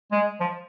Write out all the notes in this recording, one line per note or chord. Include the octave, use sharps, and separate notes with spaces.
G#3
F3